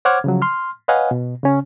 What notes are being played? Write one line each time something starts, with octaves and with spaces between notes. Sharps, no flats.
C5 C#5 F#5 D6 F6 G#6
C#3 F3 F#3
C6 F6
B4 C#5 D#5 F5 F#5 G#5
B2
C#3 C#4